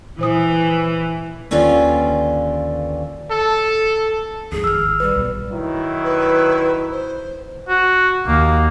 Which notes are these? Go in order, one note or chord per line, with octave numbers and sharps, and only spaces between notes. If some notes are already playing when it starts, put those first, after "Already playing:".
A#2 E3 C5 D#6
D#2 D3 C#4 F4 B4 D5
A4
F2 G#2 G#4
G#1 E6 F6
G3 B4
B1 B2
D#3 F#3 E4
B4
C5
F#4
D#2 A#3